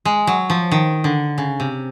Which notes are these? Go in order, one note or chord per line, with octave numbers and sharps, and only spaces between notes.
G#3
F#3
F3
D#3
D3
C#3
C3